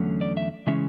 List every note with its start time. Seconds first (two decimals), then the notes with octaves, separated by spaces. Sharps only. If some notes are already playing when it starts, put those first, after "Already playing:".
Already playing: E2 D3 F#3 A3 C#4
0.21 D5
0.37 E5
0.67 C#3 E3 G#3 C#4 E5